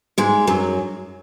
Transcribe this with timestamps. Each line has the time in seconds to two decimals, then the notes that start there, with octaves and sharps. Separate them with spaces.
0.18 G#2 G#3
0.47 F#2 F#3